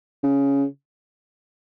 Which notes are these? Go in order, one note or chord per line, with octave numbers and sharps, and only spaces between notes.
C#3